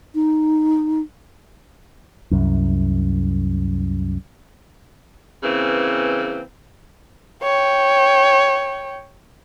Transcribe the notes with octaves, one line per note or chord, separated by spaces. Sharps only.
D#4
C2 F#2
C#3 E3 A#3 C4 B4
C#5 G5